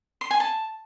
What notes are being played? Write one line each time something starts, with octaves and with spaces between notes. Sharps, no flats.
C6
G#5
A5